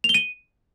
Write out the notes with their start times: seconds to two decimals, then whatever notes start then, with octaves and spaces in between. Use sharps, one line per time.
0.04 F7
0.09 G7
0.14 D#7